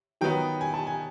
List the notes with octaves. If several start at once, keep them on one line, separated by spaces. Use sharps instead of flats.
D#3 F#3 B3 D#4 G5
G#5
A5
G#5